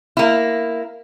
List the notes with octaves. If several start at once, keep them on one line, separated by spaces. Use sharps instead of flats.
A#3 E4